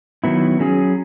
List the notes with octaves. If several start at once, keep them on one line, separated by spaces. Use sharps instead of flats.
D#3 F#3 B3 E4
F#3 C#4 G#4